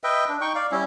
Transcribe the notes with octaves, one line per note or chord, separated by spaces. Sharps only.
B4 D#5 E5 G5
D4
D#4 G5 C#6
D5 F5
G3 C#4 E4